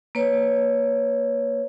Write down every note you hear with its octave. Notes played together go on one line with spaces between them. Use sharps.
A#3 B4 C#5